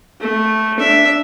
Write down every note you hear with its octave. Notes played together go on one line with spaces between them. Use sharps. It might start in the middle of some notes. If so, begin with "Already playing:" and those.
A3
D4 E5